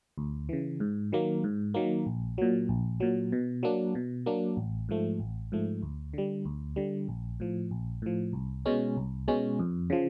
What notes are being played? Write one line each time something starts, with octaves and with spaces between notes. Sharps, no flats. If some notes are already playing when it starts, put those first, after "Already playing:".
D2
C#3 E3
G#2
D#3 F#3 A#3
G#2
D#3 F#3 A#3
A#1
A#2 F#3
A#1
A#2 F#3
B2
F#3 A#3 D4
B2
F#3 A#3 D4
A1
G#2 F3 A3
A1
G#2 F3 A3
D2
D3 G3
D2
D3 G3
A#1
A2 F3
A#1
A2 F3
C2
B2 G#3 C#4
C2
B2 G#3 C#4
F2
C#3 F3